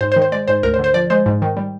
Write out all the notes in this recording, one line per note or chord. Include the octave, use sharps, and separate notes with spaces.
G#2 C5
C5
D#3
C5
G#3 D5
G#2 C5
D2 A#4
C5
D3
C5
F3 D5
G#3 C5
G#2
D#3
G3